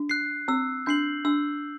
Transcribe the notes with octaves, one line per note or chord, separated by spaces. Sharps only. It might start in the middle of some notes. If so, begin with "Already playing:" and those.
Already playing: D4
F#6 C7
C4 E6
D4 G6 C7 F#7
D4 E6